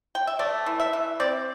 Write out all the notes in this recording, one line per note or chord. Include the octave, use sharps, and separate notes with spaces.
G5
E5
A3 D5
E3
E5
E3
C4 D5